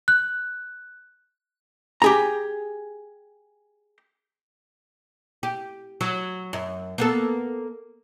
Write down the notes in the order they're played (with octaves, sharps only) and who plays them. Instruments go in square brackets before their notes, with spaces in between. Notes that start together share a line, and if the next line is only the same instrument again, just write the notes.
[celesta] F#6
[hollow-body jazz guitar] G4 G#4 A#5
[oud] G4
F#3
F#2
A#3 B3 A4